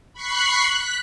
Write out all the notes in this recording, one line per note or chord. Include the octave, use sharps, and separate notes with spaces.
B5 C#6 F#6 C7
F#6 B6